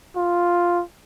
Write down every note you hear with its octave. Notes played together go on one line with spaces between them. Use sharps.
F4